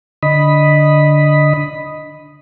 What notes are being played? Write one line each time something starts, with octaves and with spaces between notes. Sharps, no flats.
D3 D#5 B5